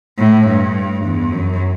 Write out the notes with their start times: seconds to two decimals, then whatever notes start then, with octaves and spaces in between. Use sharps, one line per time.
0.18 A2
0.47 G2
1.04 E2
1.32 F#2